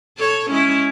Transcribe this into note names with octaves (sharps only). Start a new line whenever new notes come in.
A4 C#5
G#3 C#4 E4